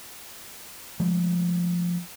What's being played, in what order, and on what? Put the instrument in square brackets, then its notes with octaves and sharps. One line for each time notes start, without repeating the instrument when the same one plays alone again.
[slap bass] F3 G#3 A3